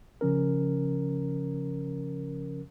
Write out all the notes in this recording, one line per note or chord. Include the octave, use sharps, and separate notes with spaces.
C#3 F3 C#4 A#4